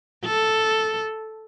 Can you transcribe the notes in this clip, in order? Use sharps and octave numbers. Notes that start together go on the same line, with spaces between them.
A4